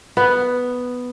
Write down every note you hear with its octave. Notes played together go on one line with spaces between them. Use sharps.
B3